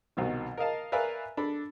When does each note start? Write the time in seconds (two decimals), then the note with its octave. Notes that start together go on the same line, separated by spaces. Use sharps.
0.17 C2 B2 D#3
0.58 A#4 D#5 F5 A5
0.92 A#4 B4 D5 E5 F5 G#5
1.37 D4 A4 B5